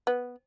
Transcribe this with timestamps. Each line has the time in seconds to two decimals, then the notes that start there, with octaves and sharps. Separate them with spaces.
0.07 B3